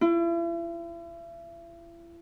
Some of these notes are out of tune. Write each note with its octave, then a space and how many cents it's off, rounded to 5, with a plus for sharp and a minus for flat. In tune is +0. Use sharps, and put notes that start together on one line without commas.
E4 +40